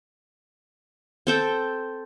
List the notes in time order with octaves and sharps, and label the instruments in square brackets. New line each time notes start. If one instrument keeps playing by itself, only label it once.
[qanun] C4 A4 G5